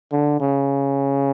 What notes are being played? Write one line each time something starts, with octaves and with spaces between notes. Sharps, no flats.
D3
C#3